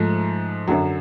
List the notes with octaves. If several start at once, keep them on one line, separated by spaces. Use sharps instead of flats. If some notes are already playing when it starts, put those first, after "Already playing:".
Already playing: G#2 F3 A3
F#2 D3 F#3